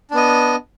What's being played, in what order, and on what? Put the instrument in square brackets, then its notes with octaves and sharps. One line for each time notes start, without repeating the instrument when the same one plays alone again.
[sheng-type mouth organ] D4
B3
D#5